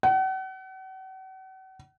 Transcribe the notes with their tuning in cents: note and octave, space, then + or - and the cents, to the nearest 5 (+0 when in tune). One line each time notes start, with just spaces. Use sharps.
F#5 +40